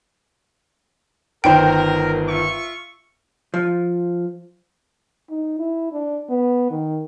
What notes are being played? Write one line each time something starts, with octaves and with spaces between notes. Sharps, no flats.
G1 D#3 A#4 C5 G5
F4 E5 C#6
F3
D#4
E4
D4
B3
D#3